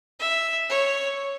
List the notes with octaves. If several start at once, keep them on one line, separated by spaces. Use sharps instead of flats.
E5
C#5